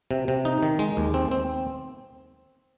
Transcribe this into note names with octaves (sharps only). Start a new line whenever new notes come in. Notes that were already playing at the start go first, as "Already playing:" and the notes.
C3
C3
D#4
D#3
G#3
D#2
C4
C4